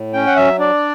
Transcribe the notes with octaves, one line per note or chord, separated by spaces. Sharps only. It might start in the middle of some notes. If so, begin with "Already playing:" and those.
Already playing: A2
C#4 G5
F#5
F#3 E5
D4 D5